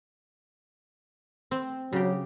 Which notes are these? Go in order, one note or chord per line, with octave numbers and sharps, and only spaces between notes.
C4
C#3 F#3 G4